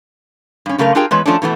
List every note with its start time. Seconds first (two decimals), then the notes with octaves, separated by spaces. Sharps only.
0.66 G2 C#4
0.78 F#2 C#3 A3 A#4 F5
0.95 D4 F4 G4 G#4 A#4 G5
1.11 E2 G#3 B4 C#5
1.26 F3 A3 C#4 D4
1.42 B2 E3 A3 B3